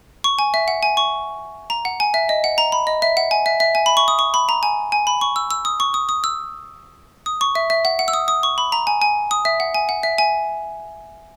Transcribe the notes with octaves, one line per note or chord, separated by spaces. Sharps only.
C#6
G#5
E5
F#5
G#5
C#6
A#5
F#5
G#5
E5
D#5
F#5
A#5
B5
D#5
E5
F#5
G#5
E5
E5
G#5
B5
C#6
D#6
C#6
B5
A#5
G#5
G#5
B5
C#6
E6
E6
D#6
C#6
D#6
D#6
E6
D#6
C#6
E5
E5
F#5
F#5
E6
D#6
D#6
C#6
B5
A#5
G#5
G#5
D#6
E5
F#5
G#5
F#5
E5
G#5